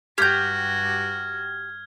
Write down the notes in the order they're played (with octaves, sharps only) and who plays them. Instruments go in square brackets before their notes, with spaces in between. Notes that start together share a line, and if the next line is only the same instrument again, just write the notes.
[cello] G2 F#4 [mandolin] G4 G6 [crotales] F6 G#6